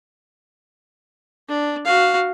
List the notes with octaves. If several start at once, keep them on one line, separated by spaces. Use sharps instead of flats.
D4
F#4 F5